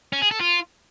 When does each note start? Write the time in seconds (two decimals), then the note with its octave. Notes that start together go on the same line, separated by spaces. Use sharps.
0.13 C#4
0.22 G#4
0.31 A4
0.40 F4